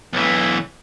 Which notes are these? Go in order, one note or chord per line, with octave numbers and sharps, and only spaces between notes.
B1 E3